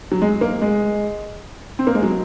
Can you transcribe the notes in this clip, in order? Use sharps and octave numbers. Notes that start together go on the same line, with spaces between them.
F#3
G#3
A#3
G#3
C4
A#3
G#3
F#3